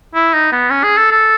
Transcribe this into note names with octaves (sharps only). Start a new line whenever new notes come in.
E4
D#4
B3
C#4
G#4
A4
A4